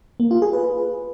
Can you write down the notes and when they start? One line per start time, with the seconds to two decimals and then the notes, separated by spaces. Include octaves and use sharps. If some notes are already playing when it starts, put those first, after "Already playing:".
0.20 A#3
0.31 F4
0.42 G#4
0.53 B4